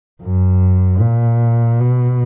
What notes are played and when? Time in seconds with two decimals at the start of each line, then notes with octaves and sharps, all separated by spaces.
0.22 F#2
1.00 A#2
1.80 B2